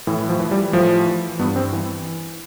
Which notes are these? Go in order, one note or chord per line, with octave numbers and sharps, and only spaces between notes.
A2 E3
F3
E3
G3
A2 F3
E3
G2 B3
C4
E3